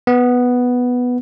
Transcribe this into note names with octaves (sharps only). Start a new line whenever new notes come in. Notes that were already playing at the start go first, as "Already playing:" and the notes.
B3